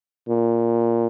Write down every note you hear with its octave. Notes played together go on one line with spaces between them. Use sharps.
A#2